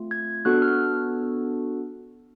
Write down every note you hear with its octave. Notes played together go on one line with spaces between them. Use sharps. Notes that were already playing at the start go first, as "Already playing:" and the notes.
Already playing: A3 C4 F4
G#6
B3 D4 F#4 A4 F#6
F6